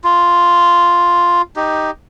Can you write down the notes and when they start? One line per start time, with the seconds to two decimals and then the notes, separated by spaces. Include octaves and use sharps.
0.04 F4
1.56 D#4 G4